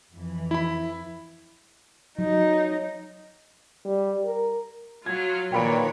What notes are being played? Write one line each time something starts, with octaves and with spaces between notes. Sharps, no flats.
F2 E3
E4 B5
F#3 D#4
G3
A#4
F#3 F4 G#6
A#2 D#3 D4 B4 C#5 G5 B5 D7